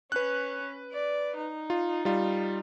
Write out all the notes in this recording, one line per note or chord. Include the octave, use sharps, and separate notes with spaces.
C#4 B4 F#6
D5
D#4
F4
G3 F4